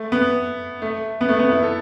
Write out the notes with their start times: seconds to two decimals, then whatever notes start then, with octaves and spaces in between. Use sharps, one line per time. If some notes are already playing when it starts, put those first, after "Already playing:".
Already playing: A3
0.12 B3
0.82 A3
1.21 B3
1.29 A3
1.39 B3
1.51 E4
1.63 A4